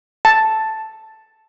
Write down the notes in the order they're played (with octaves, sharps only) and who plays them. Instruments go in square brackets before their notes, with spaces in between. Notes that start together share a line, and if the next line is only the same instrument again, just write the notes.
[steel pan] A5